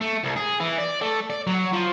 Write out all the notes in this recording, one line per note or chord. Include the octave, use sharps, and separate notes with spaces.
A3
C2
G#4
E3
D5
A3
D5
F#3
F3